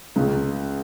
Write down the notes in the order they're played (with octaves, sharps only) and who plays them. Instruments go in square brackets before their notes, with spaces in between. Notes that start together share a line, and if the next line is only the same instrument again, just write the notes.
[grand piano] C#2 C#3